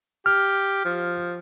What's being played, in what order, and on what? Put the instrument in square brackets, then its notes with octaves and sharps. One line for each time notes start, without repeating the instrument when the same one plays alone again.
[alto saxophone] G4 [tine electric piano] F6
[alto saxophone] F3